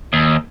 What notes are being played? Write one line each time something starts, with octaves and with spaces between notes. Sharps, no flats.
D#2